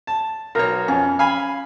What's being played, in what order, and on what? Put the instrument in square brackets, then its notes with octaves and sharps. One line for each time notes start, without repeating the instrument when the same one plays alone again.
[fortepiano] A5
[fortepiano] B1 [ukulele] A#4 C#5
[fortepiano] F2 [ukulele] C#4
[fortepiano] F5 G#5 B5